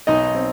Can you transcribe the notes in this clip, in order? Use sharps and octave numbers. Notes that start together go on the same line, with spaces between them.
B1 D#4 D#5
C4